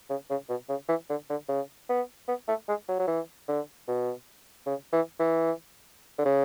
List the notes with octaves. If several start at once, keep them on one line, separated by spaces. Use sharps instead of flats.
C#3
C#3
B2
C#3
E3
D3
D3
C#3
B3
B3
A3
G#3
F#3
F#3
E3
D3
B2
C#3
E3
E3
D3
C#3